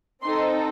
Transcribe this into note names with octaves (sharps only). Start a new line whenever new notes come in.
C4 D#4 A4 C6